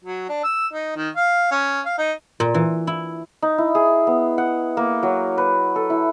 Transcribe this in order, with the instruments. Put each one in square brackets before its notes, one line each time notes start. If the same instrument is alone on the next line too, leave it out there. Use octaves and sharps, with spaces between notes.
[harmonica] F#3
D4
E6
D#4
D#3
F5
C#4
F5
D#4
[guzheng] A#2
E3
E4
[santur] D#4
E4
G#4
B3
F#5
A#3
F#3
B4
A4
E4